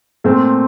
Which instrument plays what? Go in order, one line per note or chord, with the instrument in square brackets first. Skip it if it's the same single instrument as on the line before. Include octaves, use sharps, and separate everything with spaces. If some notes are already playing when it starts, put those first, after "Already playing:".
[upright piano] A#2 A3 C4